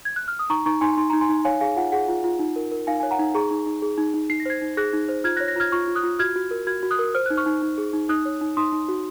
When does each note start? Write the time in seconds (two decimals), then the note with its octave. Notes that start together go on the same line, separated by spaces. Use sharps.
0.05 G#6
0.16 F#6
0.28 F6
0.39 D#6
0.50 D#4 A#5 C#6
0.66 D#4 A#5 C#6
0.81 D#4 G#5 C6
0.97 D#4 C6
1.10 D#4 A#5
1.21 G#5 C6
1.29 D#4
1.45 C#5 F5 G#5
1.61 G#4 F5 G#5
1.77 F4 F#5
1.92 G#4 F#5
2.08 F4
2.24 F4
2.39 D#4
2.56 A#4
2.72 A#4
2.87 D#4 F5 G#5
3.00 C#5 G#5
3.11 F#5 A#5
3.19 D#4
3.35 G#4 A#5 C#6
3.51 D#4
3.66 D#4
3.82 G#4
3.98 D#4
4.14 D#4
4.30 D#4 C7
4.40 A#6
4.46 C5 G#6 C7
4.62 D#4
4.77 G#4 F#6 A#6
4.93 D#4
5.09 C5
5.24 F4 F6 G#6
5.36 F#6 A#6
5.40 C#5
5.48 F#6 A#6
5.56 F4 F6 G#6
5.72 F4 C#6 F6
5.88 F4
5.95 D#6 F#6
6.03 F4
6.19 F#4 F6 G#6
6.36 F#4
6.51 A#4
6.67 F#4 F6 G#6
6.83 F#4
6.91 D#6 F#6
6.99 A#4
7.14 C5 F6
7.26 D#4 F#6
7.37 C#6 F6
7.46 D#4
7.62 D#4
7.78 G#4
7.93 D#4
8.09 D#4 D#6 F#6
8.25 C#5
8.41 D#4
8.57 D#4 C6 D#6
8.72 D#4
8.88 F#4